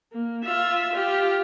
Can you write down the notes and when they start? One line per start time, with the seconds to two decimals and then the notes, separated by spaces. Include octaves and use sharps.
0.12 A#3
0.44 F4 E5
0.93 F4 G4